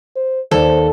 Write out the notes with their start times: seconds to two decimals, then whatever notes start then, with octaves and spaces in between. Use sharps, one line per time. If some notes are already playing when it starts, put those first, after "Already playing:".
0.16 C5
0.51 D#2 A4 C5 D5